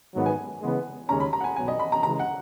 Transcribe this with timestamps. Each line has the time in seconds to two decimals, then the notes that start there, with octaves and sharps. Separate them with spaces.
0.14 G#2 D#3 F#3 B3
0.26 G#5
0.61 C#3 E3 G#3 B3
1.08 D#2 C#3 G#3 C#4 A#5
1.20 B5
1.33 A#5
1.40 F#5
1.44 G#5
1.56 B1 B2 F#3 B3 G#5
1.68 D#5
1.79 B5
1.92 A#5
2.03 C#3 E3 G#3 A#5
2.19 F#5